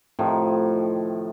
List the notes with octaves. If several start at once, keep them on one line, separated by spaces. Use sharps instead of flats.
A2 C3 D#3 F3